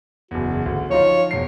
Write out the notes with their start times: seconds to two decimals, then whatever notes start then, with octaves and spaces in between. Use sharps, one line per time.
0.31 F#1 E2 F#4
0.66 D2 F#4
0.90 F3 D#4 F4 C#5
1.31 E1 C7